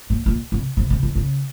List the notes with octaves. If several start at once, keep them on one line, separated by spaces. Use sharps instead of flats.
A#2
A#2
C3
C3
C3
C#3
C#3